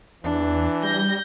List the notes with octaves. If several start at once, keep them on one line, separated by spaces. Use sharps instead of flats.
E2 E3 D4
G3 G6 A#6